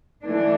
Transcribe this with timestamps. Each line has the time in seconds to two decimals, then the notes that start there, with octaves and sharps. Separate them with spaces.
0.24 E3 A3 D4